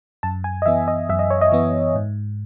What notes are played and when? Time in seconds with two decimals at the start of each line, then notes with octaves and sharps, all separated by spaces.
0.23 F#2 A5
0.44 G#5
0.62 D#5
0.66 E3 B3 E5
0.88 D#5
1.09 F#2 E5
1.19 D#5
1.30 C#5
1.41 D#5
1.52 E3 B3
1.95 G#2